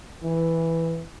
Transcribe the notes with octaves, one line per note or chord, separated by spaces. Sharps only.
E3